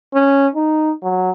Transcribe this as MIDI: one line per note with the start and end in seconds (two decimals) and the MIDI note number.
0.14 0.48 61
0.55 0.92 63
1.03 1.31 54